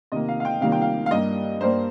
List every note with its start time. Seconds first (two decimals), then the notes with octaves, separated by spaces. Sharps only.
0.12 C3 D#3 A#3 D#5
0.29 F5
0.40 F5
0.45 G5
0.61 C3 D#3 G3 A#3 F5
0.72 G5
0.82 F5
1.06 F5
1.11 G2 G3 A#3 D#5
1.61 G2 G3 A#3 C5